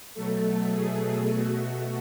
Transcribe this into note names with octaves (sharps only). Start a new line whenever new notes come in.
B2 F#3 A3 A4
G#4
B2 A3 F#4